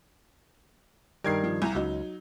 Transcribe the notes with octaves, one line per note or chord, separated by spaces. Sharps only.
G2 D#3 G3 A#4 G#6 C7
F3
C2 G#5 A#5
C#2 F#3 D#4